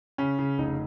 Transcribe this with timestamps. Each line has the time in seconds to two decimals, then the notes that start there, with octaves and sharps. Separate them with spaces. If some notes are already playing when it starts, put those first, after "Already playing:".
0.18 C#3 C#4
0.39 C#3
0.58 F1 D#4